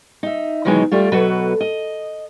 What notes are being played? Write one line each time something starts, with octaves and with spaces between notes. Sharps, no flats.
D#4 E5
B2 D#3 E3 F#3 G#3 D#4
G3 A3 F4
B2 F#3 F#4 A4 B4
D#5